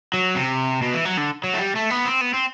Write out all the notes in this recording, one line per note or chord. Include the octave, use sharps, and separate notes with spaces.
F#3
C3
B2
E3
F#3
D3
F#3
A3
G3
A3
B3
C4
B3
C4